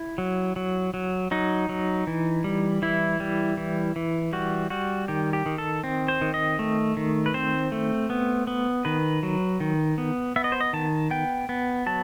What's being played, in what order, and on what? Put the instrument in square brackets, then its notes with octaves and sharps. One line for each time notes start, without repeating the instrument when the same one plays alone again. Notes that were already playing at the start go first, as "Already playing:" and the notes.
Already playing: [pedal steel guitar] E4
F#3
F#3
F#3
F#3 D#4
F#3
E3
G3
E3 E4
G3
E3
E3
G3 F#4
G3 F#4
D#3 G4
G4
D#3
A4
C4
C5
D#3
D#5
A3
D#3
B4
C4 C5
A3
B3
B3
D#3 B4
F#3
D#3
B3
B3 E5
D#5
C5
D#5
D#3 A5
B3 G5
B3
F#3 A5